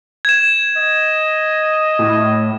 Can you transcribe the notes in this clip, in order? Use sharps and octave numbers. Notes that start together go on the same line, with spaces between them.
G#6 E7
D#5
A2